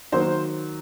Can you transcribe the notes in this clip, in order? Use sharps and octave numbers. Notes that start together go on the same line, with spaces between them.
D#3 F#3 A#3 C5